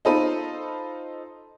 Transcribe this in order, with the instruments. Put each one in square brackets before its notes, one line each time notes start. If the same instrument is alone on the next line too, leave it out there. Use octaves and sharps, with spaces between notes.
[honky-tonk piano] D#4 F4 A4 C5 B5 D#7